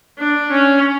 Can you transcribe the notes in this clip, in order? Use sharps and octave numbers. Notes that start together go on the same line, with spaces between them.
D4
C#4